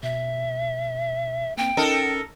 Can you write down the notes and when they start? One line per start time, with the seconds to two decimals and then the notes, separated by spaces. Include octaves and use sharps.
0.03 B2 E5
1.57 A#3 C4 G5
1.77 C#4 D#4 A4 A#4